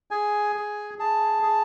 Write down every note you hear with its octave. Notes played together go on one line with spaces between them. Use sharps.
G#4 G#5
G#4
G#4 A5
G#4